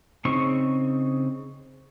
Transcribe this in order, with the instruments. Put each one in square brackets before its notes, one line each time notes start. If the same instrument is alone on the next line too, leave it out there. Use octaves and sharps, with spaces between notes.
[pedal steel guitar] C#3 C4 D#4 C#6